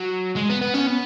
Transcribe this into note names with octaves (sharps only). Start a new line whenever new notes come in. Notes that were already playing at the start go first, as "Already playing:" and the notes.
Already playing: F#3
G#3
B3
B3
C#4
B3